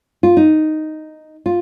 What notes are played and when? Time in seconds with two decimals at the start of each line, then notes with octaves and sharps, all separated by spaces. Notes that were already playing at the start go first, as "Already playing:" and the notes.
0.23 F4
0.37 D#4
1.46 F4